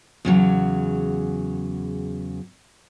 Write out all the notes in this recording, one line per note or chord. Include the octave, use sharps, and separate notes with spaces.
E2 C#3 F#3